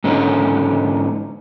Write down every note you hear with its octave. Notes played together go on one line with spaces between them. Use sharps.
G#2 D3 C#4 D#4